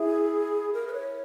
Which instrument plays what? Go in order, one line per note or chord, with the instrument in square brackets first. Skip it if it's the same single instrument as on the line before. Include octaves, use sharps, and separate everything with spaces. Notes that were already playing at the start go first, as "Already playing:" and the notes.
Already playing: [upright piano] E4 [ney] G#4
[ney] A#4
B4
C#5